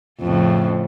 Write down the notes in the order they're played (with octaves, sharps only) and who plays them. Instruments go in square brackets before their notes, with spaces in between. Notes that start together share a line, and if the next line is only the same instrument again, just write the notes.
[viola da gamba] F2 A2 C#3